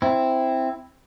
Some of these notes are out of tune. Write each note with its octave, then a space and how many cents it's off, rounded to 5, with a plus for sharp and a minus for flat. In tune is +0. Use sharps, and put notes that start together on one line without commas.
C4 +0 E4 +0